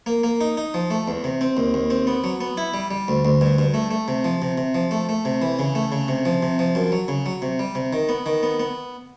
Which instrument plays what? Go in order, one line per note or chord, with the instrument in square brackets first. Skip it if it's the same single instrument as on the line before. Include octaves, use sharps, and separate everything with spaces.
[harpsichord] A#3
A#3
D#4
D#4
F3
A3
E2
C3
C4
D#2
D#2
C4
B3
F#3
B3
E4
G3
G3
D2
D2
G2
G2
A3
A3
C3
F3
C3
C3
F3
A3
A3
C3
E3
C#3
A3
C#3
C3
F3
C3
F3
F#2
F#3
C#3
F#3
C3
G3
C3
D#3
B3
D#3
B3
B3